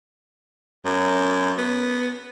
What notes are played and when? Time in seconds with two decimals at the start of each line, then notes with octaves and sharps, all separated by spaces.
0.85 F#2
1.58 B3